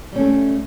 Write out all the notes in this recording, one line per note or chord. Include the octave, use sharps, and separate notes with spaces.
G3 A3 C#4